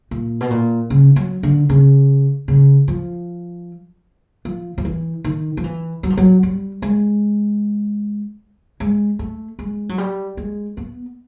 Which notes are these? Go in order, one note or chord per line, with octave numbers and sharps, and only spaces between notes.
A#2
B2
A#2
C#3
F#3
D3
C#3
C#3
F3
F3
F3
E3
D#3
F3
E3
F#3
F3
F#3
G3
G#3
G#3
A3
G#3
F#3
G3
G#3
B3